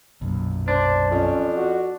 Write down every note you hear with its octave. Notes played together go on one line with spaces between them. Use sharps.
B1 F#2 A#2
D4 C5
F2 C#4
F#4